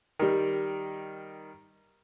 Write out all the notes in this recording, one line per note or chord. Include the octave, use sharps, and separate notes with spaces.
D#3 G3